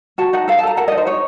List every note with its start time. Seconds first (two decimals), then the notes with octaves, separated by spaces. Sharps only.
0.18 F#4 A5
0.33 D#4 F#5
0.48 A4 F5
0.58 A5
0.63 A4 A#5
0.77 A#4 F#5
0.88 D#5
0.92 D#4
0.97 C5
1.06 D#4 C#5